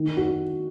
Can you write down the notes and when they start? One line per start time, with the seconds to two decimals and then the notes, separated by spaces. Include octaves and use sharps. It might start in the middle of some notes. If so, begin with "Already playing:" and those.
Already playing: D#3
0.17 F#4